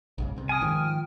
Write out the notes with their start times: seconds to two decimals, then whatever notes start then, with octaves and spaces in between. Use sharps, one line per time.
0.18 B1 G#2 C#3
0.36 C2 C3
0.49 G5 G#5 D#6 F6
0.61 G#2 D#3 F3